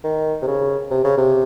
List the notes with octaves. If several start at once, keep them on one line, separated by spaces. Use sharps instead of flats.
D#3
C3
C#3
C3
C#3
C3